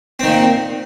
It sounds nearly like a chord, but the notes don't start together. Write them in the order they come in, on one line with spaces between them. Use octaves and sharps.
C4 D#3 A#2